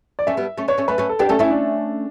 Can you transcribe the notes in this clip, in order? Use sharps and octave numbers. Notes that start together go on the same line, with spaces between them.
D5
A3 C#4 E5
G3 B3
A3 C#4
B3 D4 C#5
A3 C#4
A3 C#4 B4
A3 C#4
A4
B3 D4 G4
A3 C#4 A4
A3 C#4 E4
D4